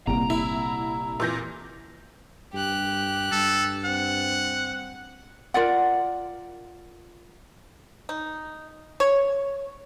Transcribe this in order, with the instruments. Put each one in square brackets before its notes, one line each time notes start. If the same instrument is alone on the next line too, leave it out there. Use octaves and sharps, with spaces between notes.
[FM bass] G1 [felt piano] C2 A#2 D7 [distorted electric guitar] A#5
[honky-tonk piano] E4
[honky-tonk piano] A#2 E3 A#6 [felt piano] E6 G6
[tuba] G2 [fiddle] G4 F#6
[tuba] G2 [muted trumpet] A4
[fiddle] C4 [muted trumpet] F#5
[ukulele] F4 A#4 D5 F#5
[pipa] D#4
C#5